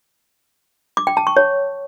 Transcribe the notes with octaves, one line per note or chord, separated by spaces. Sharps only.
D6
G5
A5
C#6
C#5